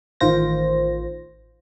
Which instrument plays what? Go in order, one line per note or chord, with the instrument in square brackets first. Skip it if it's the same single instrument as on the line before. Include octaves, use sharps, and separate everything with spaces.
[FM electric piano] A1 D#3 F4 C5 A#6